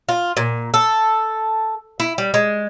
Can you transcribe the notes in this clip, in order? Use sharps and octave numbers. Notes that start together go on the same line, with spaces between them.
F4
A#2
A4
E4
G3
G#3